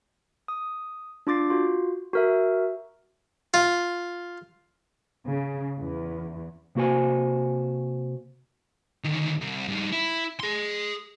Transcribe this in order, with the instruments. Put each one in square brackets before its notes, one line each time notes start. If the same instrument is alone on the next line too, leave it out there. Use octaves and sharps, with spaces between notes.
[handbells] D#6
D4 F4 D6 A6 C7
F4 F#4
F#4 A#4 E5
[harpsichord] F4
[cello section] C#3
E2
[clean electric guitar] C3 A#3 F#4 C5 G#5
[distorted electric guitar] D2 D#3
C2
G2 D#4
E4
G#4 C6